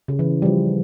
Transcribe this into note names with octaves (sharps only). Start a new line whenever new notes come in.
C#3
E3
G3
F3